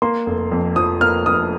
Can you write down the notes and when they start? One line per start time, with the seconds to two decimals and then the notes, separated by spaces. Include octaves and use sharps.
0.02 A#3 C6
0.26 F1
0.52 F2
0.76 F3 D#6
1.01 A#3 F6
1.26 F1 D#6